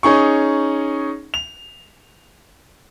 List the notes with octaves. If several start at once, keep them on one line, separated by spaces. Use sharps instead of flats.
C#4 D#4 G#4 C#6
F7